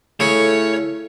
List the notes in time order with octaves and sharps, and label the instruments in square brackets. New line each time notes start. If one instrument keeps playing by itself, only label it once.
[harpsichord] C#3 [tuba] A3 [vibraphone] E4 A4 [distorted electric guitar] C#5